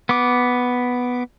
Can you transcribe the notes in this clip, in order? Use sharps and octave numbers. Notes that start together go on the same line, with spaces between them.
B3 D6